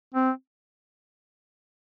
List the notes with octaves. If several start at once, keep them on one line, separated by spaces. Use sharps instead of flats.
C4